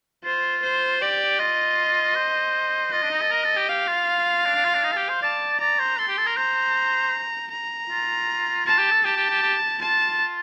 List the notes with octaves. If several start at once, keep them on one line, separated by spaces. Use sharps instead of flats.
F4 C5
C5
G4 D5
F4 D#5
C5
F4 D#5
D4
D#4
A4
A#4
A4
G4
G4 F5
F4
D4
D4
F4
D4
D#4
A4
G4
C5
D5 A5
D5 A#5
C5
A4 C6
G4
A4
A#4
C5 A#5
A#5
F4
F4 A5
G4
A4
G4 A5
G4
G4
G4
F4 A5